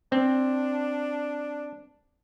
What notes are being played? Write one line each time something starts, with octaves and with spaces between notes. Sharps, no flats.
C4 D4